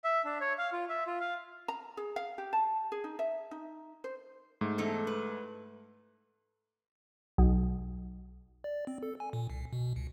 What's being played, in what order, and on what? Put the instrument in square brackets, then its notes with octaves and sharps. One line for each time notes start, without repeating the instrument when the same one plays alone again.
[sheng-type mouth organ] E5
D4
C#5
F5
F4
E5
F4
F5
[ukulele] A#5
G#4
F5
G4
A5
G#4
D#4
E5
D#4
C5
[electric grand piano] G#2 A3
[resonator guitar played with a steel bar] E2 D#4 A4
B4
[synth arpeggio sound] B1
[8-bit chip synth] D5
C4
A4
G#5
A#2
C2
B2
C#2